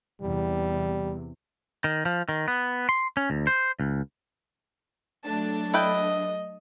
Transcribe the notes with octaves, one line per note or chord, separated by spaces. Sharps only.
E2 C3 G3
D#3
F3
D#3
B3
C6
C#4
D2
C5
C#2
F#3 A3 D4 A5
E4 B4 D#5 G5